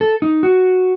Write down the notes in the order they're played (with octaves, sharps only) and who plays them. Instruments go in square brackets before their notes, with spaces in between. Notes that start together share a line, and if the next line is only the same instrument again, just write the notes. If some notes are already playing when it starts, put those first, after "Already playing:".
[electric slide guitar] A4
D#4
F#4